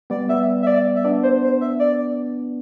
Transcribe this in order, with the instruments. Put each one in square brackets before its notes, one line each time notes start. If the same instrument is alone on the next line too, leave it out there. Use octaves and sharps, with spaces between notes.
[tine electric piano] G3 B3 [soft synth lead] D5
[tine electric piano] G3 B3 [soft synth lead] E5
[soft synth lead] E5
D5
E5
[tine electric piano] B3 D4 [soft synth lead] D5
[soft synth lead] C5
C5
E5
D5